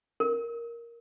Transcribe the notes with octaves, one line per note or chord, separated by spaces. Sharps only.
A#4